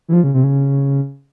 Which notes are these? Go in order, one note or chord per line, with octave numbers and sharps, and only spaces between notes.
E3
F3
C#3
C3
C#3